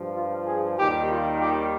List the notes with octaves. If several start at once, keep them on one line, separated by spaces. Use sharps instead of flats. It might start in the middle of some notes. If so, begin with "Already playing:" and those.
Already playing: G2 F3
F4
G#4
D#2 D#3 G3 G4
F4
G4